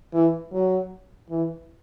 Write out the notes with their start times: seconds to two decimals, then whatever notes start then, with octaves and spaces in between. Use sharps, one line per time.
0.14 E3
0.52 F#3
1.30 E3